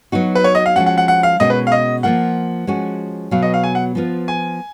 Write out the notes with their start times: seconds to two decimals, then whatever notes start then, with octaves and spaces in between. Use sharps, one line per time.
0.12 F#3 B3 D#4 F#4
0.35 B4
0.44 C#5
0.55 D#5
0.66 F5
0.76 F3 G#3 C#4 F#4 F#5
0.86 F#5
0.98 F#5
1.08 F#5
1.23 F5
1.40 B2 G#3 C#4 F#4 A#4 D#5
1.50 B4
1.67 F5
1.72 D#5
2.03 F3 A#3 F4 A#4 F#5
2.67 F3 G#3 C#4 F#4
3.31 B2 F#3 B3 F5
3.42 D#5
3.54 F5
3.63 G#5
3.75 F#5
3.95 F3 B3 F4
4.28 G#5